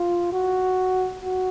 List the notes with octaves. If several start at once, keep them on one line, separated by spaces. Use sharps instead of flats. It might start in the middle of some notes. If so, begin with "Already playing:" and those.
Already playing: F4
F#4
F#4